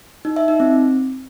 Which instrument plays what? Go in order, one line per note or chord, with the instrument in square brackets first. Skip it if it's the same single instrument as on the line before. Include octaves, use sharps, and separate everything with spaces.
[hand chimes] D#4
E5
D#4
C4